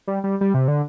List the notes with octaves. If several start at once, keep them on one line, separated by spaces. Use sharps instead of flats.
G3
G3
G3
C3
D3